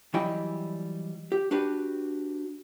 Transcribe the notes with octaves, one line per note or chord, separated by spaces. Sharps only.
E3 F#3 G3 E4 D#5 G5
G4
D4 F#4 G4 B4